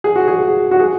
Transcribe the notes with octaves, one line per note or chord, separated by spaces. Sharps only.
G#4
F#4
G#4
F#4
G#4